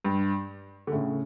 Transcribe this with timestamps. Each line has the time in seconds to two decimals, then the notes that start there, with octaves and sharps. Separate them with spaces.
0.05 G2
0.87 D3
0.92 A2 C#3